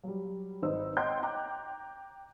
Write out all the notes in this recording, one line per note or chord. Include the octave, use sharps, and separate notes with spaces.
F#3 G3
G#1 D#4 B4 C5 E6
C#5 D#5 F#5 G5 C6 G6
G5 A#5 D6 F#6